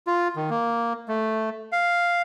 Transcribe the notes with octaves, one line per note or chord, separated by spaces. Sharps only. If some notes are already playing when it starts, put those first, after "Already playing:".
F4
D#3
A#3
A3
F5